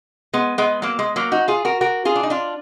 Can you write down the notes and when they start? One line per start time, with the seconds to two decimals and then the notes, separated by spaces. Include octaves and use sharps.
0.33 G#3 B3
0.58 G#3 B3
0.82 F#3 A#3
0.99 G#3
1.16 F#3 A#3
1.32 D#4 F#4
1.48 F4 G#4
1.65 F#4 A#4
1.81 F#4 A#4
2.05 F4 G#4
2.15 D4
2.23 D#4
2.30 D4 F4